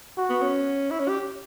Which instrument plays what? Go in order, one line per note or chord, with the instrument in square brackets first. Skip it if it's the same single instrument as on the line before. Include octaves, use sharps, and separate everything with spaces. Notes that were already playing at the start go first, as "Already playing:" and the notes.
[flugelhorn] F#4
[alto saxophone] B3
C#4
E4
C#4
G4